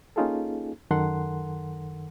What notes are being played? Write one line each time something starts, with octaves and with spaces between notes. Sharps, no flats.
A#3 C#4 D#4 F4 G#4 A4
F#2 D#3 A4 A#4 F#5 C6